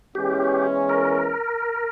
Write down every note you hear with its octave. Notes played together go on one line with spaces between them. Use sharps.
E2 E3 G#3 C#4 G4
A#4